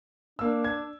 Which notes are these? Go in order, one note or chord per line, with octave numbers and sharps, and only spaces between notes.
A#3 D4 E6
G#6